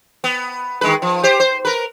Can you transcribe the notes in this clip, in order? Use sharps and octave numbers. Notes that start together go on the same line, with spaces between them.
B3
D#3 G#3 B4
F3
G4 C5
C5
A#4 B4